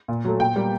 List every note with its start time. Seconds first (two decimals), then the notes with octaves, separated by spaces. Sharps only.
0.08 A#2
0.25 F#3 A3
0.40 A#2 G5
0.56 G3 A#3